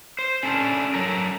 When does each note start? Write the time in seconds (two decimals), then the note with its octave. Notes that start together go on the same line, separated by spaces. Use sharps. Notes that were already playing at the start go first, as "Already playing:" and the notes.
0.19 C5
0.43 C#4 D4 A4
0.94 F#3 A4 A#4